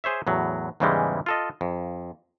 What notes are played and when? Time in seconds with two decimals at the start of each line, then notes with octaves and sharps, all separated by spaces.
0.04 G#4 C5 C#5 E5
0.27 E2 A2 F#3
0.80 E2 G#2 C#3 E3 G3 G#3
1.26 F4 A4 D#5
1.61 F2